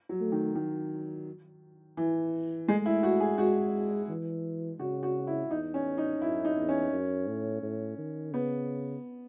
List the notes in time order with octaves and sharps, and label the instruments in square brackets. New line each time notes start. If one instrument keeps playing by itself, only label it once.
[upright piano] F#3
[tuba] A3
[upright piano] D#3
D#3
E3
[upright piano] G#3 [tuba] A3
[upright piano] E4
F#4
G#4
[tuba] G#3 [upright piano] F#4
[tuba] E3
[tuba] C#3 [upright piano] F#4
[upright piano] F#4
E4
[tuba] E2 [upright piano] D#4
[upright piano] C#4
D#4
[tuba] F#2 [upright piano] E4
[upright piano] D#4
[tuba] E2
[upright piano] C#4
[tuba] F#2
A2
A2
D#3
[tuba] C#3 [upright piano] B3